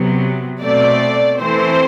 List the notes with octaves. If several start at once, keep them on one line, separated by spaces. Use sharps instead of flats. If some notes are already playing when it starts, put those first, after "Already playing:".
Already playing: C3 F#3 B3
B2 A3 C4 D5
E3 A3 C4 C5